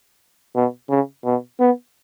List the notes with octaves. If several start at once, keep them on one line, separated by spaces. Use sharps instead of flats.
B2
C#3
B2
B3